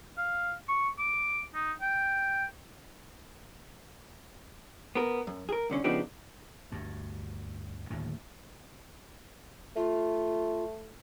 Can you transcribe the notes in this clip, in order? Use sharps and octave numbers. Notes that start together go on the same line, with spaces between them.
F5
C#6
D6
D#4
G5
B3 A#4
F#2
G#4 A#4
C2 D3 C#4
C#3 F3 B3 D4 D#4 G4
D2 G2
D1 D#2 A2 D3
A3 F4